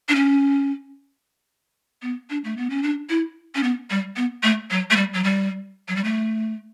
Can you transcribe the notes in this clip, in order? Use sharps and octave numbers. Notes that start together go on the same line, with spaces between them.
D4
C#4
B3
D4
A3
B3
C#4
D4
E4
C#4
B3
G3
B3
A3
F#3
A3
G3
F#3
G3
F#3
G3
A3